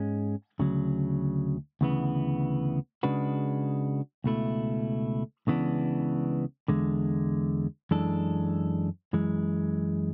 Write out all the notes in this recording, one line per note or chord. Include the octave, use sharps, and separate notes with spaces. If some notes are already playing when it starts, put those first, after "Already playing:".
Already playing: G#2 G#3 C#4
D2 C#3 F#3
D2 C#3 E3 B3
C#3 G#3 D4 F#4 B4
C#2 B2 A3 E4
C#2 C#3 E3 B3 D4
E2 D3 G#3
F#2 E3 G#3 D4 A4
F#2 E3 G#3